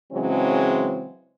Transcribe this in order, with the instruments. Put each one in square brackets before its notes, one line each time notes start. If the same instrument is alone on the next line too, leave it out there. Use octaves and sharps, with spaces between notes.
[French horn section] C#3 E3 F#3 G#3 C4 C#4